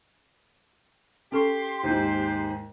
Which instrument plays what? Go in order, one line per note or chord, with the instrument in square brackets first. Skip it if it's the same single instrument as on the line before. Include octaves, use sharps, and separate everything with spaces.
[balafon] C#4 A4 C#6 [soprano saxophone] G4 [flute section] C6
[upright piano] D#2 G#2 [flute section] C5